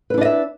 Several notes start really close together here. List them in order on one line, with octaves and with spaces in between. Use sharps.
B4 E4 D4 D#5 E5